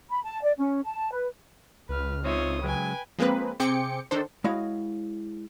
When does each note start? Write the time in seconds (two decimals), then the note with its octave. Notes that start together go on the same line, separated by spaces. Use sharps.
0.09 B5
0.23 A5
0.42 D5
0.58 C#4
0.83 A5
1.11 B4
1.89 C#2 B4 F6
2.24 C4 D#4 F4 C#5 E5 C6 D#6
2.63 C#3 F#3 G#3 B4 G5 G#5
3.19 F3 G#3 A#3 C4 B4
3.60 C3 C4 G#4 G5 D6 C#7
4.11 D#3 D4 A4 C5
4.44 G#3 E4 F#4 C#5 D#5 F5